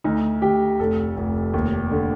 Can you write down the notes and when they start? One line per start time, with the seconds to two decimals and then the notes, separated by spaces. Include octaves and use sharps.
0.04 D2 D#4
0.42 D2 G4
0.79 F1 A4
1.17 F1
1.54 D#2
1.91 D3